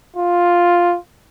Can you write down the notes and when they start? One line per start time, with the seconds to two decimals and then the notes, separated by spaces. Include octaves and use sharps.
0.17 F4